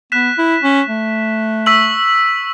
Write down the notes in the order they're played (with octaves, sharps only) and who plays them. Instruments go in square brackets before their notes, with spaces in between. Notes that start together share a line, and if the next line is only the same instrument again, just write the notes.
[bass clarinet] B3 [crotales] F#6 B6 E7
[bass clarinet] E4
C#4
A3
[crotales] C#6 E6 B6 F#7